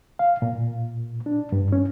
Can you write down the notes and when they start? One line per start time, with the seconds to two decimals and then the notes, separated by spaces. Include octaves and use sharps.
0.19 F5
0.42 A#2
1.26 D4
1.52 G2
1.72 C#4